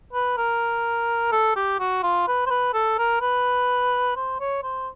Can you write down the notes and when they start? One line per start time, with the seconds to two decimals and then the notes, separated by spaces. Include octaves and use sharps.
0.13 B4
0.37 A#4
1.32 A4
1.56 G4
1.80 F#4
2.03 F4
2.27 B4
2.46 C5
2.50 B4
2.74 A4
2.98 A#4
3.21 B4
4.16 C5
4.40 C#5
4.63 C5